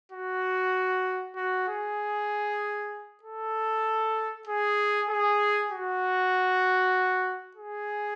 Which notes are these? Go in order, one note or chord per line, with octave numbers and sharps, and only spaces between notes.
F#4
F#4
G#4
A4
G#4
G#4
F#4
G#4